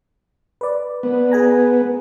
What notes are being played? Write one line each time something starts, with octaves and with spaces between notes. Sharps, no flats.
B4 D5
B3
G#4 G#5 A#5